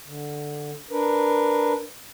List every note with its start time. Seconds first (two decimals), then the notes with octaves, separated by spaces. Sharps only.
0.05 D3
0.90 D4 A#4 B4